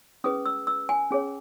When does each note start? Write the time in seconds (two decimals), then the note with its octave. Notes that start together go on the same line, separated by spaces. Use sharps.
0.24 C#4 G#4 B4 D#6
0.46 E6
0.67 E6
0.89 G#5
1.11 C#4 G#4 C#5